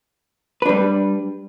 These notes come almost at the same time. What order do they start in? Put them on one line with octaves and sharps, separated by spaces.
B4 D4 G3